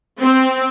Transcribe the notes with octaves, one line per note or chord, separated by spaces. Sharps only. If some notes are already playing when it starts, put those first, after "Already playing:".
C4